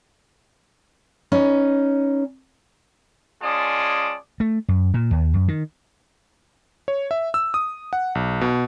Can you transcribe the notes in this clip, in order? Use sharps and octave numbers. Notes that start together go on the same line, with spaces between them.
C#4 D#4 B4
G#3 C#4 F4 D5 A5 D#6
A3
F#2
A#2
D#2
F#2
D#3
C#5
E5
E6
D#6
F#5
B1
B2